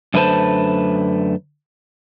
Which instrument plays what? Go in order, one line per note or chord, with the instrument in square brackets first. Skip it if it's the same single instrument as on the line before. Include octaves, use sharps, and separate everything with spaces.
[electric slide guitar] F#2 D3 A3 B4 C5 A5